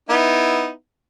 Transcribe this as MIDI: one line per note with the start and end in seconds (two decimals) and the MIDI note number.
0.09 0.69 59
0.09 0.69 63
0.09 0.69 64